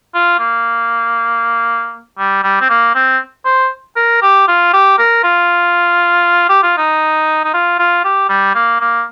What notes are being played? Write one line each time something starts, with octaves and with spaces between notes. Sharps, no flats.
F4
A#3
G3
G3
C4
A#3
C4
C5
A#4
G4
F4
G4
A#4
F4
G4
F4
D#4
D#4
F4
F4
G4
G3
A#3
A#3